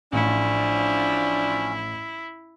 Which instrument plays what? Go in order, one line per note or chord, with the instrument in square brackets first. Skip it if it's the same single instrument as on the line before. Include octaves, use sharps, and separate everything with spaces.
[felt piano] A1 A2 C#7 [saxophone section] F3 D4 [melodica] C#4 [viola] E4